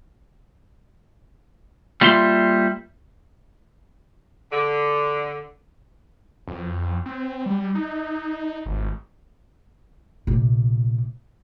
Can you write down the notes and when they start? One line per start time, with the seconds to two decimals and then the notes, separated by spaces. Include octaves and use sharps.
2.01 G3 A#3 F4 E5 C6
4.52 D3
6.47 F2
7.06 C4
7.46 G3
7.75 D#4
8.66 G#1
10.27 A#1 C3